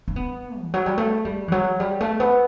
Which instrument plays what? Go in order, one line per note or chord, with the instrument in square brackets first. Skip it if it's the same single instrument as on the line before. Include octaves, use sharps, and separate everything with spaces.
[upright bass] C#4
B3
E3
F#3
G3
A3
G3
E3
F#3
G3
A3
B3